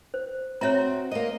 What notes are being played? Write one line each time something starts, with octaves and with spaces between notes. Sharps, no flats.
C5
C4 F#4 C#5 E5 A#5
A#3 D#5